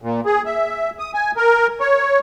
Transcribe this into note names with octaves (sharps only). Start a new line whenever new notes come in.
A#2
G#4
E5
D#6
G#5
A#4
C#5